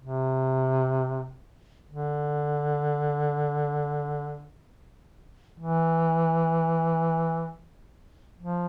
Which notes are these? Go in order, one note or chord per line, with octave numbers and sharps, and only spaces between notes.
C3
D3
E3
F3